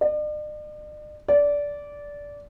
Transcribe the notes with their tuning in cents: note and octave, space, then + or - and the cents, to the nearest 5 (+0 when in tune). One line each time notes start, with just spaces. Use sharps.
D5 +45
D5 -15